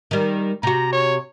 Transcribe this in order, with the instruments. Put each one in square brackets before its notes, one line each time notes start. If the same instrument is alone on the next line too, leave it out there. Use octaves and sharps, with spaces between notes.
[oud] D#3 G3
[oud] C3 F#4 [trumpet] A#5
[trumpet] C#5